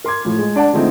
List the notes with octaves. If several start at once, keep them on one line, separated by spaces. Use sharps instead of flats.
A#4 C6 D6 G#6
A2 F3 F4
G#3
D4 D5 F#5 A5
D3 F3 G#3 A3 C4 D#4